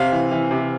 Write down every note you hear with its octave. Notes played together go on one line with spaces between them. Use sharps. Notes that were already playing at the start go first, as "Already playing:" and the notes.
Already playing: C3 F5
E3
E3
C3